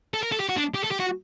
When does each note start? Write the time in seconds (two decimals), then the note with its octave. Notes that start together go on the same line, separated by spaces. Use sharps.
0.14 A4
0.23 A#4
0.32 A4
0.40 G4
0.49 F#4
0.57 D4
0.74 G4
0.83 A4
0.91 G4
1.00 F#4